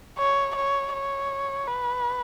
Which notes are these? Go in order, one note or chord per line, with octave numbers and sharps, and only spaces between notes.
C#5
C#5
C#5
B4